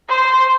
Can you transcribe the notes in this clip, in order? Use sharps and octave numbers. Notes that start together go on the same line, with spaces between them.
C5